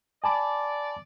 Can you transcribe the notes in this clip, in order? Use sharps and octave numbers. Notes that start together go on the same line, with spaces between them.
D5 G#5 A5 B5